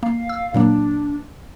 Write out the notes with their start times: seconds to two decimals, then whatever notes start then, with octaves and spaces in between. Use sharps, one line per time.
0.03 A#3 F5
0.29 E6
0.54 A#2 F#3 A#3 D4